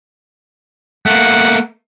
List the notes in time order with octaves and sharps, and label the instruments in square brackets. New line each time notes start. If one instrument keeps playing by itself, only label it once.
[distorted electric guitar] A3 A#3 [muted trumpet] F#5